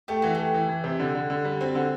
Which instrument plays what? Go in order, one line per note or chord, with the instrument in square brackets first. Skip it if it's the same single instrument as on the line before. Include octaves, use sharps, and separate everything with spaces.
[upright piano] A3 [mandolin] G4
[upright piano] E3 [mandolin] F#4
[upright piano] A3 [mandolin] G4
[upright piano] E3
E3
C3
D3
D3
D3
G3
[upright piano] C4 [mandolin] F#4
[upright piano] D3